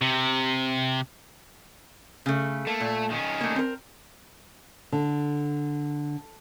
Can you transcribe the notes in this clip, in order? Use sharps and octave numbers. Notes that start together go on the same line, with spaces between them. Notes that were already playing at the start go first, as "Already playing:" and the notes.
C3
C#3 A3
A3 A#3
A#2
D#3 C#4
A3 A#3
C4 A#4
D3